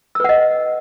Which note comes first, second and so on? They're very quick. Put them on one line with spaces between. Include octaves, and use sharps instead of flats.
E6 B4 F#5 D#5